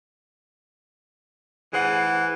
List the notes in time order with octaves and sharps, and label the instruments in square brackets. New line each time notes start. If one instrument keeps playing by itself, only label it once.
[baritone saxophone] E3 [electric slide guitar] G#4 C5 F#5